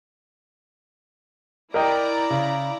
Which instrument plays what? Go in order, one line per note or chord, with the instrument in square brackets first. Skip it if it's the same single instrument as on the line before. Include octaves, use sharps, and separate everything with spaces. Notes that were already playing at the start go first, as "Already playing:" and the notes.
[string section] E4 D5 A#5 [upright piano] A#4 D#5 G5
[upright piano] C#3